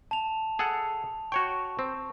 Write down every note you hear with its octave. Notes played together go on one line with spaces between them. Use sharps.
A5 F7
G#4 A4 F#5
F#4 C#5 G5 C#6
C4